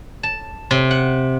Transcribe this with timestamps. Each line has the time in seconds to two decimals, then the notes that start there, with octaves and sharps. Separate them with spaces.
0.23 A5
0.71 C3
0.91 F#5